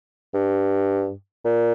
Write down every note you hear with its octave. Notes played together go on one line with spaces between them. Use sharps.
G2
A#2